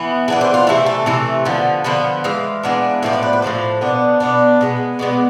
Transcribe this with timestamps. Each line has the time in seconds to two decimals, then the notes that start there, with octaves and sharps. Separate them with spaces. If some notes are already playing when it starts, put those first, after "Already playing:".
Already playing: E3 B3
0.28 E3 B3 D4 G#4
0.41 C5
0.54 F4
0.67 C3 E3 A3 E4
0.86 A4
1.06 C3 E3 A3
1.45 D3 F3 B3
1.84 D3 F3 B3 B4
2.24 E3 G#3 F5
2.63 E3 G#3 B3 D4
3.03 A2 F3 B3 D4 E5
3.13 D5
3.23 B4
3.33 B4
3.42 A2 F3 B3 D4 C5
3.81 B2 B3 D4
4.20 B2 B3 D4
4.61 B2 G#3 B3
4.99 B2 G#3 B3 D5